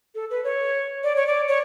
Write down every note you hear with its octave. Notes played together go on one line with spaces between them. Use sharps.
A4
B4
C#5
D5
C#5
D5
C#5